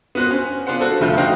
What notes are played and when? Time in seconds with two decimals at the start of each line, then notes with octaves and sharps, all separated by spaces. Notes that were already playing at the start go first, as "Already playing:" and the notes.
0.15 B3 F#4 C5
0.31 C#4
0.67 B3 D4 F4 C5 F#5
0.80 F#4 A4 C5
1.01 F1 A#1 D3 A3 F4 G6
1.17 A3 D#4 F#4 C5 F5 G5